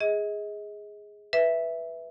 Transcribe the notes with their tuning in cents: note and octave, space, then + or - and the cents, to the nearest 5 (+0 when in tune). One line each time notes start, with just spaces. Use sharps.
G#4 -5 D#5 +35
B4 -5 E5 +0